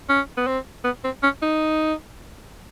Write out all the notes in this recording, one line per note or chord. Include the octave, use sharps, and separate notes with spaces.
C#4
B3
C4
B3
C4
C#4
D#4